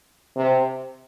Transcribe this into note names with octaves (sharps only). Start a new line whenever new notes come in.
C3